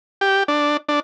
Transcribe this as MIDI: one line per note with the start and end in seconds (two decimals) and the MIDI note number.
0.21 0.43 67
0.48 0.77 62
0.89 1.00 62